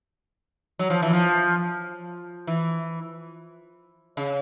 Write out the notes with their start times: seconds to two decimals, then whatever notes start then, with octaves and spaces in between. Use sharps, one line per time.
0.79 F#3
0.90 F3
1.02 E3
1.13 F3
2.47 E3
4.17 C#3